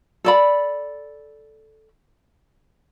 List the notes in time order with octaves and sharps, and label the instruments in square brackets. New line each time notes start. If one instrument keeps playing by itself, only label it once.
[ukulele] A4 D5 B5